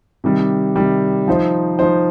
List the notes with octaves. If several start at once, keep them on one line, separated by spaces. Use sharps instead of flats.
C3 D#3 G3
C3 D#3 G3
F3 D#4 C5
F3 D#4 C5